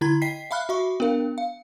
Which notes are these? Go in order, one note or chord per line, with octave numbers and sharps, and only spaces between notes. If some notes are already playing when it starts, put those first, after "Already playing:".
D3 E4 A#5 B5 G#6
D#5 G5 B6 C7
E5 F5 B5 F6 F#6
F#4 E5 B5 C#6
B3 D4 A#4 F5
F5